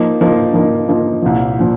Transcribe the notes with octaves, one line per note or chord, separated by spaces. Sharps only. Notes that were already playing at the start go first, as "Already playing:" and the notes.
Already playing: F3 A#3 D#4
F3 A#3 D#4
F3 A#3 D#4
F3 A#3 D#4
C2 A#2 F3
A#2 F3